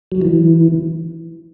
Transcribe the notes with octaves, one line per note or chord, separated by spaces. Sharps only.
F#3
E3